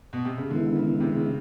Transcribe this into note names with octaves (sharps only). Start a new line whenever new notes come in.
B2
C3
C#3
D3 D#3 G#3 B3 E4
C#3
C3
C#3